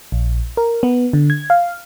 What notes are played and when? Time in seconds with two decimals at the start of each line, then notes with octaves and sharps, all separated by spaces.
0.12 A#1
0.57 A#4
0.83 B3
1.13 D3
1.30 G#6
1.50 F5